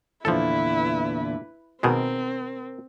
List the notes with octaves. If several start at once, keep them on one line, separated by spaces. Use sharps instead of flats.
E2 A#2 D3 F3 E4 A4 B4
B2 D#3 G#3 C4 A#4